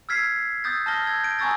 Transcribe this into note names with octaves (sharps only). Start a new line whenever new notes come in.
E6 F6 G#6 B6 C7
D#6 E6 G6 A6
A5 D#6 F6 A#6 G7
E6 G#6
G6 D7
G#5 A#5 C#6 D#6 E6 A6